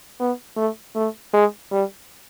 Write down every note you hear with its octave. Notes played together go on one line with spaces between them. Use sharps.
B3
A3
A3
G#3
G3